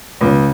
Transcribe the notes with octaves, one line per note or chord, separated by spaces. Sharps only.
C#2